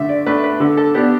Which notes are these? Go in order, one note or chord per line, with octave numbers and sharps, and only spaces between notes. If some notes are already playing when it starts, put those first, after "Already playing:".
Already playing: D3 A3 E5
D5
A3 D4 B4
B4
D3 A4
A4
B3 D4 G4